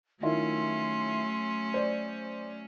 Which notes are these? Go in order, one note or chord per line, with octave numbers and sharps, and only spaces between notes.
D#3 F#3 A3 C#4 E4 F4 C6
C5 D5